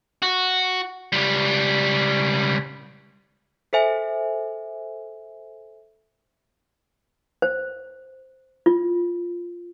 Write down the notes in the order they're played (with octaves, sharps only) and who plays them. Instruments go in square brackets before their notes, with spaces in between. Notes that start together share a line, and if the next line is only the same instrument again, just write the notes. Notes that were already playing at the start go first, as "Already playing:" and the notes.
[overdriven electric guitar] F#4
C#2 G3
[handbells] A4 C5 E5 G#5
[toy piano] C5
F4